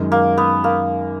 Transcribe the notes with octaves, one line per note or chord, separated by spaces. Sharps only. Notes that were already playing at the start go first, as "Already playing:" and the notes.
Already playing: F#2 D#3 G#3
A#3
B3
A#3